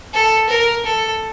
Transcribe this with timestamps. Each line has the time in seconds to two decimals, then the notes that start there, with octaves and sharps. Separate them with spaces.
0.14 A4
0.49 A#4
0.85 A4